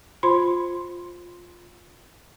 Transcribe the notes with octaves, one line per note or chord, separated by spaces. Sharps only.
F4 C5 B5 C6